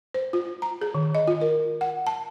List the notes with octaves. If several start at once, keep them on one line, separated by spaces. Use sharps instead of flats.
C5
F4
A#5
G#4
D#3
D#5
F4
A#4
F#5
A5